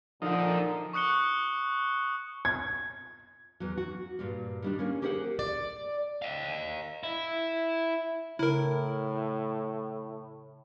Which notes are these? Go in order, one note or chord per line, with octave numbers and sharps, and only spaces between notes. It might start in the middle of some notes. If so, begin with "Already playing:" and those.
A#2 D3 F3 D#4
C#6 D#6 F#6 C#7 G7
G#6
E2 F#3
F#4
G2 A#2 G3
D#3 G3 D4
A#3 C#4
G4 G#4 A#4 C5 E5 F#5
D5
D#5 F5
E4
A2 C#3 E4 A#4 A#5